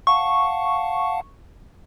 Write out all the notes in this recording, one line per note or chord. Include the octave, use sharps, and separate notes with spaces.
F5 F#5 A5 C#6